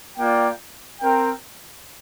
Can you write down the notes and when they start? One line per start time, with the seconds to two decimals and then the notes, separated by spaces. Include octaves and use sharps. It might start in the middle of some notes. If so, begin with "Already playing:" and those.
0.17 A#3 F4 D5 G5
1.01 C4 A#4 G5